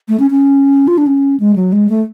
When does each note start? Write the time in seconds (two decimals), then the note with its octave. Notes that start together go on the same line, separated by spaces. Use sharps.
0.09 A3
0.19 C#4
0.30 C#4
0.88 F4
0.98 D4
1.07 C#4
1.40 G#3
1.56 F#3
1.72 G#3
1.89 A3